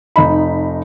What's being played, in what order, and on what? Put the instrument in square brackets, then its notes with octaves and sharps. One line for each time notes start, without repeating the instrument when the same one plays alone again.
[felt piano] F1 D#4 B5